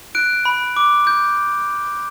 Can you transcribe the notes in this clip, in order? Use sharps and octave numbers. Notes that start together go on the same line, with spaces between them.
F#6 D7
B5
D6
G6